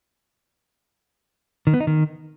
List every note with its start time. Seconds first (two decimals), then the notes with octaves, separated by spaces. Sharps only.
1.67 D#3
1.74 B3
1.80 D#4
1.87 D#3